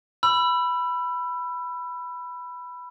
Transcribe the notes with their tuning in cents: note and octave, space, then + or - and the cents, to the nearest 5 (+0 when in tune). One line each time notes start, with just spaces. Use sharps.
B5 +0 E6 +30